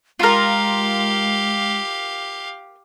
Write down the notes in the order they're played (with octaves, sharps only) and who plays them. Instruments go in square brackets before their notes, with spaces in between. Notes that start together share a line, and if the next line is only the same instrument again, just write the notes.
[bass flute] G#3 [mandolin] F4 A#4 [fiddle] G4 F5